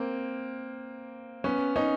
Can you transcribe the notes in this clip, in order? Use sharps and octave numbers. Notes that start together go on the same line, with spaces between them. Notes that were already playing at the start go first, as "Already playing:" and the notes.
Already playing: A#3 C4
B3 C#4
C#4 D#4